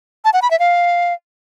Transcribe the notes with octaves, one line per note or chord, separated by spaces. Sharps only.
A5
F#5
B5
E5
F5